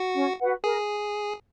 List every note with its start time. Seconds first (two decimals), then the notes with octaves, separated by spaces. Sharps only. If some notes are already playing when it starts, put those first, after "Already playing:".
Already playing: F#4
0.14 C#4
0.39 F#4 B4 F#5
0.64 G#4 A#4